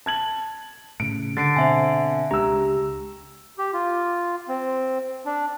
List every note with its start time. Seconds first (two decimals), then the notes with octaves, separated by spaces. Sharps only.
0.06 A5 G#6 F#7
1.00 A2 C#3 D7
1.37 D3 A6 C7 D7
1.56 B2 C4 C5 E5 G#5
2.31 C#2 G#3 D4 G4 A#5 E6
3.58 G4
3.73 F4
4.48 C4
5.26 D4